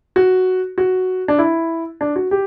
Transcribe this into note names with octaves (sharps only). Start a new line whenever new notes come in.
F#4
F#4
D4
E4
D4
F#4
G4